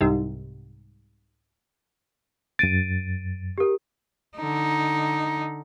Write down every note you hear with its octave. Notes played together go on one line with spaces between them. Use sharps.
C2 G#2 C3
F#2 A6 D7 D#7
G4 A#4
D3 D#4